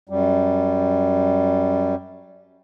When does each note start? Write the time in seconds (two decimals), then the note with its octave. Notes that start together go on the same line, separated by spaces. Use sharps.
0.09 F#2 G3